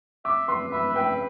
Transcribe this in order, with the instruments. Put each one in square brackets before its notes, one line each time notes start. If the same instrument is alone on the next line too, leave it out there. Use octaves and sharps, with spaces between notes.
[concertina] E5 [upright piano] D6
[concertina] B4 [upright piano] C6
[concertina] E5 [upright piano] B5
[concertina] B4 [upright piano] G5